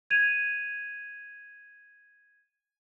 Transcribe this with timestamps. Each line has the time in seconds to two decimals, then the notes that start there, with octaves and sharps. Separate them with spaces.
0.10 G#6 D#7 F7